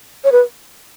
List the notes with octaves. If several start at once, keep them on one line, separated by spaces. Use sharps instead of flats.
C#5
B4